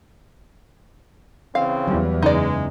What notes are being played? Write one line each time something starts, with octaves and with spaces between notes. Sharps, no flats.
C#3 E3 C4 F5
E2 F#3 G3
F#2 C#3 E3 G#3 D#4 D5